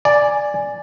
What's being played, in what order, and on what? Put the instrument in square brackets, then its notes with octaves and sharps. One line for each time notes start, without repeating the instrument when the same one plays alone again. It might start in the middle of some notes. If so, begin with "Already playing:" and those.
[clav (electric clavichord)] D5 [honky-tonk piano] G#5